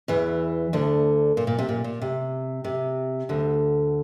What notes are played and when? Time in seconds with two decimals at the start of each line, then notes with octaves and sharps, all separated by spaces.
0.08 E2 E3
0.73 D2 D3
1.37 A#2
1.47 A#2
1.59 C3
1.69 A#2
1.84 A#2
2.01 C3
2.64 C3
3.29 D2 D3